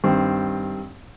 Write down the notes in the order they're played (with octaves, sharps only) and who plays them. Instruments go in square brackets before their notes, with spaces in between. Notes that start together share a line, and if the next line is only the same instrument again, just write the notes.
[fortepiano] G2 D#3 C4